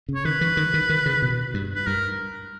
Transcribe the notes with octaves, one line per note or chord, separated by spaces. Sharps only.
C#3
C#5
D#3 B4
E3
D#3
D#3
D#3
C#3
B2
G2
B4
G2 A#4